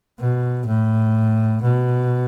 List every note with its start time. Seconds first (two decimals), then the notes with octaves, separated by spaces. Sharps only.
0.20 B2
0.66 A2
1.62 B2